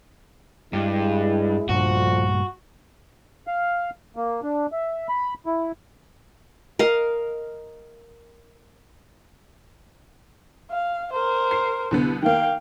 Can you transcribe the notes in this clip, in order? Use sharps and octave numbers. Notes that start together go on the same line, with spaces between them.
G2 G#3 E4
G2 A#2 D3 F3 F#4
F5
A#3
D4
E5
B5
E4
A#4 D#5 F5
F5
A#4 C5
C7
C2 D3 B3
D#3 A#3 F5 G5